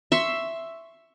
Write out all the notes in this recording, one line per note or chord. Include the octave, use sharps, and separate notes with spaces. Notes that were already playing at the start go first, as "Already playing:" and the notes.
E5 C6 C#6